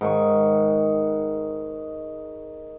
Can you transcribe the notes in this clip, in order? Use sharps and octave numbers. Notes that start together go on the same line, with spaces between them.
G#2 D#3 C#6